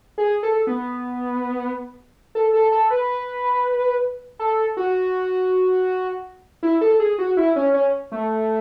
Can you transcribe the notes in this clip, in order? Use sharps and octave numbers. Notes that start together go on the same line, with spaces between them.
G#4
A4
B3
A4
A4
A4
B4
A4
F#4
E4
A4
G#4
F#4
E4
C#4
C#4
A3